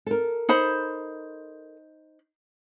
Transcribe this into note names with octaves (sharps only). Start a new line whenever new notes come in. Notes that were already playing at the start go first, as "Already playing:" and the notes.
A4 A#4
D#4 C5 B5